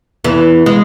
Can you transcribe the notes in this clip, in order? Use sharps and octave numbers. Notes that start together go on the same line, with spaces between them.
E2 E3
G#3